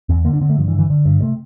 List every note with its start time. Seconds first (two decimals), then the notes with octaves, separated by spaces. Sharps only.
0.09 E2 C4
0.25 D3 A#3
0.33 D4
0.41 D3 C4
0.50 A3
0.57 G2 F3
0.68 E3
0.73 D3
0.79 E3
0.90 D3
1.05 G2
1.22 C3 A3